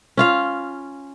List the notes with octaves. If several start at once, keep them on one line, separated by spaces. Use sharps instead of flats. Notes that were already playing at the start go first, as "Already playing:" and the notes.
C#4 F4 F5